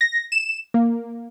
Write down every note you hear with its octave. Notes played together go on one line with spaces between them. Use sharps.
A#6
E7
A#3